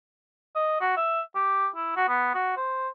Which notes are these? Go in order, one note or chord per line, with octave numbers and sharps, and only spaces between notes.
D#5
F#4
E5
G4
E4
F#4
B3
F#4
C5